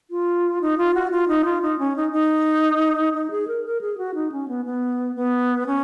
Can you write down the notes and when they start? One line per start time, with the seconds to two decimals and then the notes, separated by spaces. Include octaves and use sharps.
0.11 F4
0.61 D#4
0.78 F4
0.94 F#4
1.11 F4
1.28 D#4
1.45 F4
1.62 D#4
1.79 C#4
1.96 D#4
2.12 D#4
3.13 D#4
3.31 G#4
3.48 A#4
3.64 A#4
3.81 G#4
3.98 F#4
4.15 D#4
4.32 C#4
4.48 B3
4.65 B3
5.16 B3
5.67 C#4